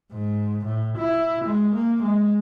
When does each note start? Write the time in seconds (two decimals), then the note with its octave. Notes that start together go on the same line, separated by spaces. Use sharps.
0.13 G#2
0.65 A2
0.98 E4
1.45 G#3
1.74 A#3
2.03 G#3